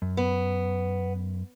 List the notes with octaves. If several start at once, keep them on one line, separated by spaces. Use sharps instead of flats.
F#2
B3